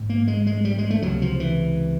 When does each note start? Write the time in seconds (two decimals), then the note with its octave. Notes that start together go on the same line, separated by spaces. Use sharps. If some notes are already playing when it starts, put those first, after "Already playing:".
Already playing: A#1 G#2
0.09 A#3
0.27 G#3
0.47 G#3
0.65 G3
0.78 G#3
0.90 A3
1.02 C#2 C3 F#3
1.22 F3
1.40 E3